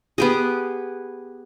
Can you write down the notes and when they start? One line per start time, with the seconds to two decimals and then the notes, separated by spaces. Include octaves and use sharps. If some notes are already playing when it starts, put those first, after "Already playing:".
0.18 B3 G4 G#4